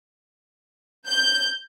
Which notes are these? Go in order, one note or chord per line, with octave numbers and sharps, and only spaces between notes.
G6